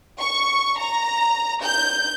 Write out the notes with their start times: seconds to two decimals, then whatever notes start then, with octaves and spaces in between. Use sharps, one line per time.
0.19 C#6
0.79 A#5
1.64 G6